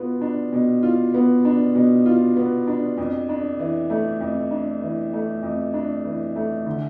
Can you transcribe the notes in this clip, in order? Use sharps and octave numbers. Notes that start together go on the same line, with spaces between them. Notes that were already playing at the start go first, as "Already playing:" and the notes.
Already playing: B2 B3 F4
D4
B2
F4
B3
D4
B2
F4
B3
D4
F2
D4
E3
A3
F2
D4
E3
A3
F2
D4
E3
A3
D3